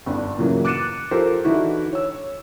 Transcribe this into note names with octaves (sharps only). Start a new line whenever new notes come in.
G1 B3 D4
A#2 C#3 E3 F#3 A#3
D6 F#6 A6 C#7 D#7 E7
F3 G4 A4 A#4 C5
D3 E3 D#4 E4 F#4
C#5 E6